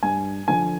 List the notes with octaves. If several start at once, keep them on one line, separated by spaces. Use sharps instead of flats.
G2 G#5
D3 F3 G#5